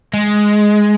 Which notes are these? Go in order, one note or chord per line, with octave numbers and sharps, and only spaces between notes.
G#3